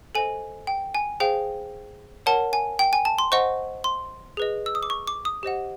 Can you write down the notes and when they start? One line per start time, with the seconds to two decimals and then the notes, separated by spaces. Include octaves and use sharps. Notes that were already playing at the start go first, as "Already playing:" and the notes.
0.15 A4 C5 D#5 G#5
0.67 G5
0.95 G#5
1.20 G#4 C5 F5 G5
2.26 A#4 C#5 F#5 A5
2.53 G#5
2.79 G5
2.93 G#5
3.05 A5
3.19 C6
3.32 C5 D#5 F#5 C#6
3.84 C6
4.37 G#4 B4 D#5
4.66 E6
4.75 D#6
4.83 D6
4.90 C#6
5.07 D6
5.25 D#6
5.43 G4 C5 D#5 F#5